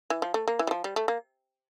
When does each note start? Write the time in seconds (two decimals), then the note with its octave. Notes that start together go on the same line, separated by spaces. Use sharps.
0.10 E3
0.22 F3
0.34 A3
0.48 A#3
0.59 E3
0.67 G3
0.71 F3
0.84 G3
0.96 A3
1.08 A#3